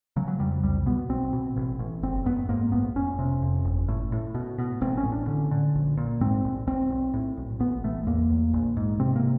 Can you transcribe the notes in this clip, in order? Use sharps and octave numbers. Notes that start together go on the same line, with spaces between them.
C#3 F#3
F#3
F2 G3
C2 G3
B2 B3
B1 C4
B2
A1
A1
F#1 C4
F#2 B3
G#2 A#3
A#1 B3
F1 C#4
C3
F2
G1
A2
A2
B2
B2
A1 C4
C#4
A2
D4
D3 C#4
D3
A#1
A#2
G#2 C4
A#1
B1 C4
B1
A2
B1
A1 B3
A1 A3
E2 A#3
E2
A#1
G#2
C3 C4
A#3